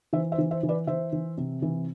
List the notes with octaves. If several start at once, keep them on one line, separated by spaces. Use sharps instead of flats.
E3 C5 E5
C5 E5
E3
C5 E5
E3
B4 D5
E3 C5 E5
E3
C3
E3